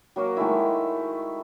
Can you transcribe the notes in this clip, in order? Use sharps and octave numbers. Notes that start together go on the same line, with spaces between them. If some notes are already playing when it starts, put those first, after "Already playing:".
F#3 A#3 F#4 A#4
D#3 G#3 A3 E4